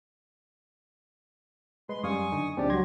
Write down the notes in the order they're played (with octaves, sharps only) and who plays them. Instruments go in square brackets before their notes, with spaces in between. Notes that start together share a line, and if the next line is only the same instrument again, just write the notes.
[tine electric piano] G#3 [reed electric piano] B4 [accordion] C6
[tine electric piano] F#2 G3 [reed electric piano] F5 C6 [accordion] G#5 C#6 D#6
[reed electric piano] F#2 D3 [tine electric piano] D#4
[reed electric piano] C#2 F3 G#3 [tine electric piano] C4 D4 D5 [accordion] G4
[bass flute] F#3 [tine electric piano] C6 G#6 A#6